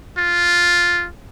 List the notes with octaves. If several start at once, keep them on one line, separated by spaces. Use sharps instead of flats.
F4